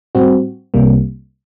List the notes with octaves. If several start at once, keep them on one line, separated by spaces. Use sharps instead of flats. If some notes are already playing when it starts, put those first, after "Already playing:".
A2 G3 C4 F#4
C2 C3 G3 A#3